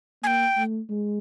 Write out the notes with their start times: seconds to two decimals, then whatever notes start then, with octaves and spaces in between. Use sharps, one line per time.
0.23 A#3 G#5
0.27 G5
0.57 A3
0.89 G#3